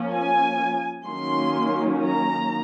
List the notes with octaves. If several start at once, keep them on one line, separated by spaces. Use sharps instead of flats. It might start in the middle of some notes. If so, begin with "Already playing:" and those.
Already playing: F3 A#3 C#4
G#5
D#3 F#3 A#3 C#4 C6
A#5